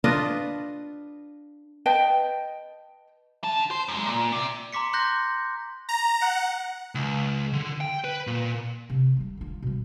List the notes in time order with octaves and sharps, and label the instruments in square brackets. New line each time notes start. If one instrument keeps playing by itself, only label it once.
[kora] D4 F4 B4 D#5
[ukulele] B4 D#5 G5 A5
[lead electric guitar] D3 A5
C5
F#2 G#3
A#2
C3
[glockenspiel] A#5 C6 D6 B6 C#7
C6 F#6 G6 A#6
[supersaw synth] A#5
F#5
[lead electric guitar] C#2
D3
G5
B4
A#2
[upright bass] C3
G3 C4
D3 F4
B2 G3